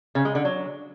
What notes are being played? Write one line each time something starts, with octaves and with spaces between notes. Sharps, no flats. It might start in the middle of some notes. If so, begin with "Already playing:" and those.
C#3
G#3
D3
F#3